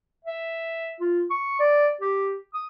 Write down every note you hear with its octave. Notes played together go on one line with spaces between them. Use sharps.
E5
F4
C#6
D5
G4
D#6